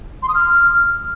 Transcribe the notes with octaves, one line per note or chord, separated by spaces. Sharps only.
C6
D#6
F6